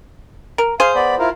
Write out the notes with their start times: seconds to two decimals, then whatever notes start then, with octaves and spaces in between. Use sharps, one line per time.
0.58 A#4
0.80 G#4 C5 F5
0.95 B3 D5 B5
1.19 E4 F4 A#4